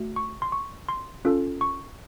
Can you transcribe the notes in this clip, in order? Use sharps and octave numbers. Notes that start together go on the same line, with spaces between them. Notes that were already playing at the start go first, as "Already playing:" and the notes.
Already playing: A3 F#4
C#6
C6
C#6
C6
C#4 F4 A4
C#6